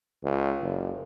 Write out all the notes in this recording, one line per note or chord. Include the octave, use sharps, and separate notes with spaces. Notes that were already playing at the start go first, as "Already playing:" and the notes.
C#2
F#1